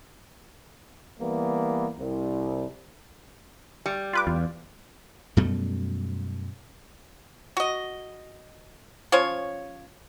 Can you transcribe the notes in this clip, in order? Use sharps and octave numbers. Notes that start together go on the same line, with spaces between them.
E3 G3 A#3 B3
C2
G3
F4 B4 D6
E2 F4
F#2 B2 G3 A3
F#4 D#5
F3 C#4 C5 C#5